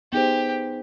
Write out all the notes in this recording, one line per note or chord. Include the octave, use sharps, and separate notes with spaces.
B3 D#4 G4 G#4 C5